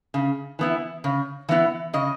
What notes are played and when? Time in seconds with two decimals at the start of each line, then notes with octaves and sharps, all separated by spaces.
0.14 C#3
0.59 E3 B3 E4
1.04 C#3
1.49 E3 B3 E4
1.93 C#3 D#5